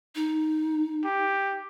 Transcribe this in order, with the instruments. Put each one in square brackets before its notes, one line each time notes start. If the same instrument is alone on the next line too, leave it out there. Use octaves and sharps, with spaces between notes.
[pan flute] D#4
[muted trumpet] G4